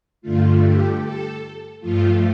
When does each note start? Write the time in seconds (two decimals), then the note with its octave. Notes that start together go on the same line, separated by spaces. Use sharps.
0.22 G2 D3 A3 F4
0.61 G4
1.01 A4
1.80 G2 F3 A3 F4